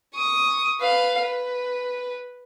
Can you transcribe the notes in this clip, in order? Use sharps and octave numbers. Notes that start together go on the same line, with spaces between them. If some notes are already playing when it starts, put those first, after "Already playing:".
C#6 D#6
B4 F5
B4